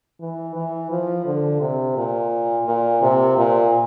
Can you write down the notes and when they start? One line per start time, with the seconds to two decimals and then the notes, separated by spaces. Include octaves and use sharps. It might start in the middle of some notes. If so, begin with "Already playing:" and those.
0.20 E3
0.55 E3
0.91 F3
1.26 D3
1.61 C3
1.97 A#2
2.66 A#2
3.02 C3
3.37 A#2